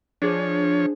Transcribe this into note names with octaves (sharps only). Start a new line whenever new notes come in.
F3 D4 G#4 C5 C#5